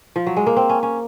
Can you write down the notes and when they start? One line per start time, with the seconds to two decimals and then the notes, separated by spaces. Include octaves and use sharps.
0.16 F3
0.27 F#3
0.37 G#3
0.47 A#3
0.56 C4
0.69 C#4
0.83 C#4